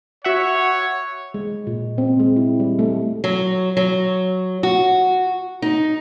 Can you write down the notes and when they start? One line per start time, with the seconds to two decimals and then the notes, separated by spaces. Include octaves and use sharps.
0.24 F#4 C#5 E5 F#5
1.34 G#3
1.67 A#2
1.98 C4
2.19 G#3
2.36 E4
2.60 G3
2.79 A3
3.24 F#3
3.77 F#3
4.63 F#4
5.62 D#4